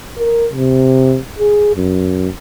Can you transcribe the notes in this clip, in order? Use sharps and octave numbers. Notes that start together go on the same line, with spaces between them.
A#4
C3
G#4
F#2